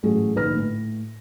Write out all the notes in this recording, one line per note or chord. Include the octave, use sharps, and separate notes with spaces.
A1 F#3 A3 G#4
A#1 D3 D#4 B4 F6 A#6
A2